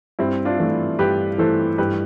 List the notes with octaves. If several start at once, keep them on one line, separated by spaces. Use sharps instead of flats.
G2 C4 E4
D4 F4
E3 A3 E4
G2 G4 B4
E3 A3 E4 A4 C5
G2 G4 B4